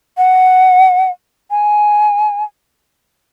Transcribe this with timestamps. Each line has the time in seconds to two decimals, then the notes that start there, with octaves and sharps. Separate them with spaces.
0.17 F#5
1.51 G#5